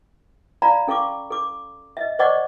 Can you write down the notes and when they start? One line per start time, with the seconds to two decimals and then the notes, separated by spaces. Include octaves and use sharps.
0.62 D5 F5 G#5 A#5 B5
0.87 C#4 A4 F5 C#6 D6
1.31 A4 D6
1.97 D#5 E5
2.19 C5 D5 D#5 F#5 C#6 D6